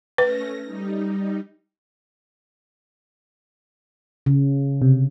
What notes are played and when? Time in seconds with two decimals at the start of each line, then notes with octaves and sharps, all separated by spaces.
0.18 A3 C#4 B4 A#6
0.63 G3 D#4
4.26 C#3
4.82 C3